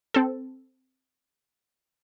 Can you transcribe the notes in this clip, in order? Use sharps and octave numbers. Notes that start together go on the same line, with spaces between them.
C4 A4